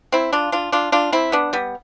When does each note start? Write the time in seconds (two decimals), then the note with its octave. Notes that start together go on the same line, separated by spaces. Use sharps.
0.12 C4 E4
0.33 D4 F4
0.52 D4 F4
0.72 D4 F4
0.92 D4 F4
1.12 C4 E4
1.32 B3 D4
1.53 G3 B3